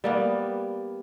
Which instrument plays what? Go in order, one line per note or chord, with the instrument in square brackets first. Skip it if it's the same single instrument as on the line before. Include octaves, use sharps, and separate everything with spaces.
[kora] G3 A#3 B3